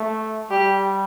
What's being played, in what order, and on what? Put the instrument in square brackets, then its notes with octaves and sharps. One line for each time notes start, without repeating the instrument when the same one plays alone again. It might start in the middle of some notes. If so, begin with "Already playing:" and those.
Already playing: [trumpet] A3
[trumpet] G3 [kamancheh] G4